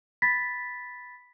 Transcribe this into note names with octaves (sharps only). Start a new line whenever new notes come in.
B5 A6 B6